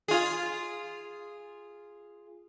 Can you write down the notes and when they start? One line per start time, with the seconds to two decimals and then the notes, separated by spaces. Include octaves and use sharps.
0.08 F4 G#4